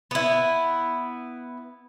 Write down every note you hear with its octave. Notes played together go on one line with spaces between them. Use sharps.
B3 E4